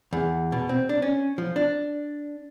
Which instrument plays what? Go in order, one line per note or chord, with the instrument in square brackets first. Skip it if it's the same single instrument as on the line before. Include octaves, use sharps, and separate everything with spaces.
[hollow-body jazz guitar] E2
B2
C4
D4
C#4
F3
D4